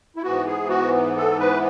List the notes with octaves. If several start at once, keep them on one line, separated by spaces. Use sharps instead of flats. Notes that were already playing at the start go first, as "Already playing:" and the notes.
E4
G#2 E3 B3 F#4
G#4
F#4
A4
B4